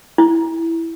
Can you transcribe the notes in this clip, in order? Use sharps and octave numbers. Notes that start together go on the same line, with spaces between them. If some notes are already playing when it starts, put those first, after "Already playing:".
E4